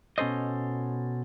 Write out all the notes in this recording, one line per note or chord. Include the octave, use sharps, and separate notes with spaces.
B2 C#4 A4 C5 D#5